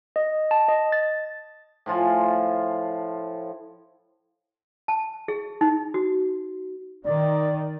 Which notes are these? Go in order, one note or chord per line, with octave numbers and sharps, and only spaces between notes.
D#5
A5
D#5
A6
A2 F3 F4 G#5
A5
G#4
D#4
F#4
D#3 D5